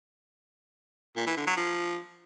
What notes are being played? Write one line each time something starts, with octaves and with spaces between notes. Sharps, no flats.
A#2
E3
D3
F#3
F3